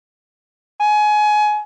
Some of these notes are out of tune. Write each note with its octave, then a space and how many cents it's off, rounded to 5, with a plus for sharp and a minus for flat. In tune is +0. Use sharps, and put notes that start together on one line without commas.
G#5 +25